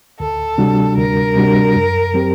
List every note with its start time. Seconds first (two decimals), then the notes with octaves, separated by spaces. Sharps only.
0.19 D2 A4
0.58 C3 G3 D4 F#4
0.97 D2 A#4
1.36 C3 G3 D4 F#4
1.75 F#2
2.14 F#3 C4 G4